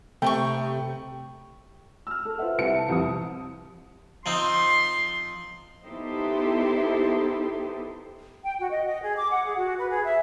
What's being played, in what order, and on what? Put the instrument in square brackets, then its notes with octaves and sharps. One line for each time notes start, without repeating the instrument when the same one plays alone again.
[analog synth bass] C3 [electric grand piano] A3 [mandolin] B3 D#4 C#6 [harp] G5
[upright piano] E6 F6
A4
F4 B4 C5 E5 F#5
C2 B4 E5 C#7
A5
C2 F2 D#6
[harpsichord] F3 C4 D#4 [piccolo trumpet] C6
[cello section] B3 D#4 E4 G4 A4 C5
[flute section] G5
F#4
D#5
D#5
G#4
D6
F#5
G#4
F#4
B4
G#4
E5